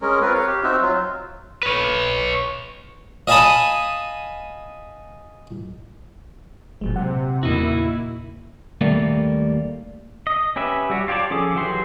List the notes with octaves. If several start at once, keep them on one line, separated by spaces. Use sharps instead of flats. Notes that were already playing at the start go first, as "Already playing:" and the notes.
G#3 C#4 A#4
C4 F4 A#4 B4
C#5 F5
G4
C4 D#4 F#4 E5
F#3 F4
B4 C#5
D#5 F5 G#5 A5 B5 D#6
F1 A#2 F#3 G#3
C3 F#5
E2 A#2 C#3 A#3 D#4 E4 F#4
D#2 G3 A3 A#3
D#5
C#4 G4 B4 E5
G3 F#4 G4
F4 G4 C#5 D5 A5
F3 C#4 G#4 A4 D6
E3 F#3 F#4 G4 C6